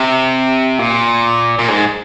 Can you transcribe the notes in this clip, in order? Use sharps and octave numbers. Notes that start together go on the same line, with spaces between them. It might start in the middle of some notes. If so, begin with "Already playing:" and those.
Already playing: C3
A#2
A#2
G#2